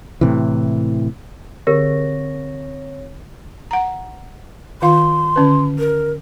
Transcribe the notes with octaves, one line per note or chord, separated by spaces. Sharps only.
A2 C3 E3
D3 C4 G4 G#4 A#4 C#5 A#6
F#5 A#5
D#3 F4 F5 C6
D3 C#4 B4
A#4